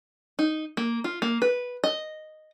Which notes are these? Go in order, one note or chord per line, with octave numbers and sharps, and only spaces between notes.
D#4
A#3
F4
A#3
B4
D#5